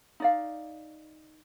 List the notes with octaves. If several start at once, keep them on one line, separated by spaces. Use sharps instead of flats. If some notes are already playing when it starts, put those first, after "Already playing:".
D#4 D5 F5